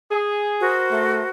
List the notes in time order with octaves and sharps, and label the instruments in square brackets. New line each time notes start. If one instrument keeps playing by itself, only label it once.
[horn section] G#4
[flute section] F#4 A#4 C5
[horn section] A3